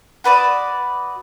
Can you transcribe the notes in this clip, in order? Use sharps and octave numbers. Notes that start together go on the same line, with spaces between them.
F#4 B4 D5 D#6